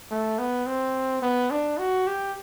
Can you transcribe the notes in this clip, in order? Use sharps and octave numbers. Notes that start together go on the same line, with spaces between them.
A3
B3
C4
B3
D4
F#4
G4